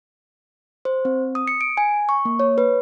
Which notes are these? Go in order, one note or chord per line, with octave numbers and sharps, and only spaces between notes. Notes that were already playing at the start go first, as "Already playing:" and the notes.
C5
C4
D#6
C#7
D7
G#5
C#6
A#3
C#5
B4